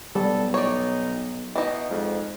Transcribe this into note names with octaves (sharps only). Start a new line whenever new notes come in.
B1 G3 A4
D#4 C#5 D5
B2 E3 D#4
F2 G#2